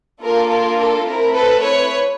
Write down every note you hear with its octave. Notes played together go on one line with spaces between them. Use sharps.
A#3 D4 F4 A4 A#4
A#4
A4
A3 C4 E4 A#4
A4 B4
B4 C#5